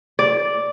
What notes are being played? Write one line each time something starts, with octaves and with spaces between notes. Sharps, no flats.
D5